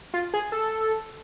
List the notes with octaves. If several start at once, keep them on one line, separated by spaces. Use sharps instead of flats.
F4
G#4
A4